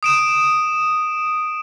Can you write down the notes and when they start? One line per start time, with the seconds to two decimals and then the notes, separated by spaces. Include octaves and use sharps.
0.03 D#6 D7 E7